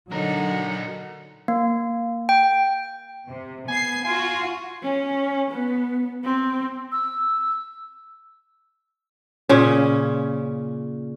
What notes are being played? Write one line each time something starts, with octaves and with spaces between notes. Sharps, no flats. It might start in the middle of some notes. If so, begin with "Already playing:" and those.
D3 F#3 D4 D#4 A#4 F#5
A#3
G5
C3
B3 G#5 C7
F4 F#4 G#5
C#4
B3
C4
E6
A#2 C#3 C#4